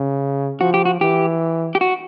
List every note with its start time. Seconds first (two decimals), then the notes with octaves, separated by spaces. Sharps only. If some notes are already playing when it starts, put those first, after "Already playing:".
Already playing: C#3
0.60 F3 F#4
0.74 G4
0.85 F#4
1.01 E3 G4
1.75 G4
1.81 F#4